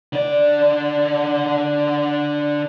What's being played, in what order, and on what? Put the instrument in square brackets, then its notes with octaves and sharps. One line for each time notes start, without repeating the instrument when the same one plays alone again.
[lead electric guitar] D3 D5